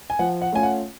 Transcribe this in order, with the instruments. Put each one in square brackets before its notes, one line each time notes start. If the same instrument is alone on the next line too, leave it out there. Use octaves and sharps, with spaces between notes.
[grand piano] G#5
F3 F#5
F#5
A3 C#4 F4 G#5
F#5